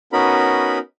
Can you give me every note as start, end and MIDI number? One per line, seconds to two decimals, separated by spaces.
0.13 0.78 59
0.13 0.78 61
0.13 0.78 63
0.13 0.78 66
0.13 0.78 70
0.13 0.78 83